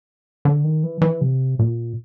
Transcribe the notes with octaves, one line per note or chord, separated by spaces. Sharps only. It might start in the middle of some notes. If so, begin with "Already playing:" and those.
D3
D#3
E3
E3
C3
A#2